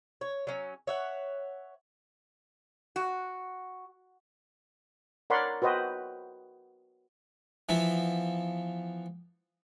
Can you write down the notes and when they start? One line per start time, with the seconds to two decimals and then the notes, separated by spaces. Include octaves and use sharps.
0.21 C#5
0.47 F#3 C#4
0.87 C#5 E5 F#5
2.96 F#4
5.30 A#4 C#5 D5 F#5 B5 C6
5.62 F#4 B4 C5 D#5 G5
7.69 E3 F3 B3